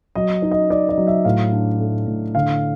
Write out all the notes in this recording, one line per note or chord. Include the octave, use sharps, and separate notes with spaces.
F#3 D#5
D#4
D#5
D#4 D5
D#5
F#3
E5
A2 F5
D4
A3
A2
D3 F5